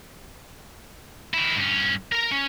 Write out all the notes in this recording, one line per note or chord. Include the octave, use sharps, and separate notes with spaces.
D#3 E4
G2 C#4
A#4 A#5
C#4